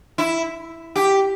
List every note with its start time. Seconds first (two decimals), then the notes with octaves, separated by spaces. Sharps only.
0.18 E4
0.96 G4